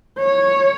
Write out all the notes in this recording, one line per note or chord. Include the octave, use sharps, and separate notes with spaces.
C#5